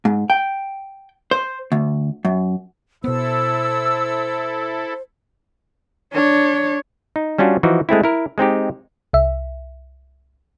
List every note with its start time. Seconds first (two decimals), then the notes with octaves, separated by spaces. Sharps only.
0.05 G#2
0.30 G5
1.31 C5
1.72 D2
2.25 F#2
3.04 B2 B3 E4 A4 C5 E6
6.13 D4 C#5
7.16 D#4
7.38 G3 C#4 D4 F4 F#4
7.63 E3 F3 D#4 F#4
7.89 G#3 A3 C4 E4
8.04 E4 A#4
8.38 G#3 C4 D#4 G4
9.13 C2 E5